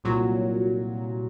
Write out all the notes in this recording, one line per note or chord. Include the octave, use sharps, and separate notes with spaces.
C2 A#2 F#3